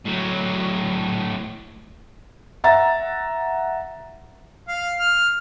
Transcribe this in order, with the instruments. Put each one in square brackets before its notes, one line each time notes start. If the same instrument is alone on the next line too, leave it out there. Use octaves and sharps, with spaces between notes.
[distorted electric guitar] A2 F#3
[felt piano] E5 F#5 A#5 A6
[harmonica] F5
F6